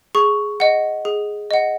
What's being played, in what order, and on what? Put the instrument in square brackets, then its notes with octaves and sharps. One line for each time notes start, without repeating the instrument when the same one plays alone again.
[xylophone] G#4 C#6
D#5 F#5
G#4
D#5 F#5